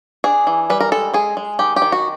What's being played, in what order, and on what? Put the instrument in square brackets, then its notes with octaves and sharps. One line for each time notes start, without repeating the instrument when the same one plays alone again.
[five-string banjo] D4 G#4
E3
G3 B4
A#4
G#3 A4
G#3 G#4
G#3
D#3 G4
G4
D#3
F#4